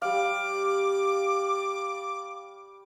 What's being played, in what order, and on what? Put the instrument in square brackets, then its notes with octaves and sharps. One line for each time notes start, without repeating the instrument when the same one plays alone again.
[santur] G3 F5 [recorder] D6